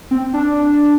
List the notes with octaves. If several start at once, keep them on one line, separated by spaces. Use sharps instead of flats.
C4
D4